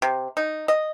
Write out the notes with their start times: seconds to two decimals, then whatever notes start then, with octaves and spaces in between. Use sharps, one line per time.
0.02 C3
0.37 D#4
0.68 D#5